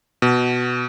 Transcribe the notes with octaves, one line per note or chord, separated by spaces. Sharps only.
B2